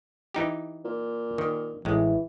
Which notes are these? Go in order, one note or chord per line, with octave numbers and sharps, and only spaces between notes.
E3 D#4 G4
A#2
D#3
A1 E3 G#3